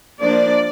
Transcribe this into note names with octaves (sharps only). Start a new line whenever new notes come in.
F3 A#3 D4 D5